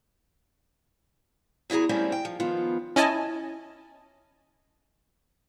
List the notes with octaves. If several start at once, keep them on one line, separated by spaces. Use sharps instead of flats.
E2 E4 F#4 G#4 A#5
G3 A3 A#3 C4 C#4 E4
G5
F3
D#3 F3 B3 F4
C#4 E4 D#5 G#5 A5